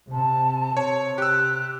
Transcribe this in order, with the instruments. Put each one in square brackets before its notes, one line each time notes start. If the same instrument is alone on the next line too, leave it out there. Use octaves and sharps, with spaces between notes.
[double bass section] C3 [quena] A5
[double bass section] C3 [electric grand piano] C#5
[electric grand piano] G4 E6 [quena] F#6